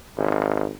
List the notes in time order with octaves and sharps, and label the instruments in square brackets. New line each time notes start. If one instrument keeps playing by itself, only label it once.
[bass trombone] G#1